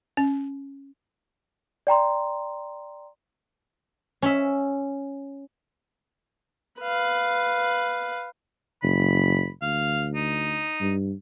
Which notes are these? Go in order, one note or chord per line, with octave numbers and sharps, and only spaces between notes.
C#4
D5 G5 A#5 C6
C#4 E5
B4 F5
F#1 B5
D2 F5
D#4
G2